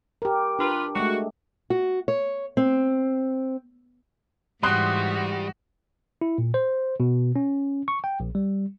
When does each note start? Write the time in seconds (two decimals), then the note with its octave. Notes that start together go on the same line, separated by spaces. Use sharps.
0.22 G4 A#4
0.59 D4 F4 G4 B4
0.96 G#3 A3 F#4
1.70 F#4
2.08 C#5
2.57 C4
4.63 G#2 E3 G3 F#4 C6 D#6 F#6
6.21 E4
6.38 A#2
6.54 C5
7.00 B2
7.36 C#4
7.88 C#6
8.04 G5
8.20 A#1
8.35 G3